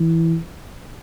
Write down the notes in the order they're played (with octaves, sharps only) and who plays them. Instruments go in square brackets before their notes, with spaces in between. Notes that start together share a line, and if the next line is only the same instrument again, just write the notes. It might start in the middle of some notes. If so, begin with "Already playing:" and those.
Already playing: [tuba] E3